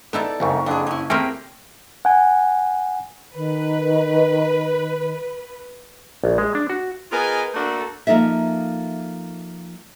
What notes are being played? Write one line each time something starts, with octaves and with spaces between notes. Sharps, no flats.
B3 D#4 E4 A4 D5
F#1 C2 F2 G#2 C#6
F2 D3 F#3 D4 G#4
C#4 E4
A3 A#3 C4 G4 G#4 A#4 G5 A#6
F#5 G#5
D#3 B4
A#1
G#3
D4
F#4
B3 F4 G#4 A#4 D#5 G#5
A3 A#3 D4 F#4 A4
F3 A#3 D#4 A4 E5